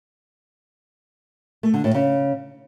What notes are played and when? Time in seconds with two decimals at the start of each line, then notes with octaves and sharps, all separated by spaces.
1.63 A3
1.74 D3
1.84 A2
1.94 C#3